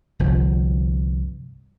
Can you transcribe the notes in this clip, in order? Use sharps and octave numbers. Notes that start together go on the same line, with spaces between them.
G1 C2 F3